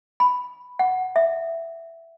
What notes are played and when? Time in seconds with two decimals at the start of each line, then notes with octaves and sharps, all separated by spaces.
0.20 B5
0.79 F#5
1.16 E5